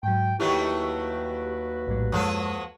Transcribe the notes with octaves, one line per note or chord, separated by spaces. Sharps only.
G#2 F#3 G5
D#2 D#3 F#3 A3 E4 F#4 G4 B4
A#1 A2 G3
F#2 F3 F#3 G#3 A4